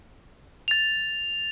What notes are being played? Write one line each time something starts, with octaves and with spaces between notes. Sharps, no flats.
A6 F7